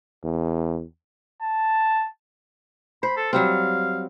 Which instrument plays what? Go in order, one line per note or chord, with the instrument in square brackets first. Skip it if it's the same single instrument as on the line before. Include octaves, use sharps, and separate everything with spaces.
[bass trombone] E2
[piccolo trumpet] A5
[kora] C5 [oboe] B5
[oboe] A4
[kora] F#3 G3 C4 [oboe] F5